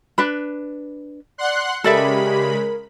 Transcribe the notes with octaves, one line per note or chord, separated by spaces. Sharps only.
D4 B4 B5
D5 F#5 C6 F#6
C#3 G#3 G4 A4 A#4 D5 E5 B5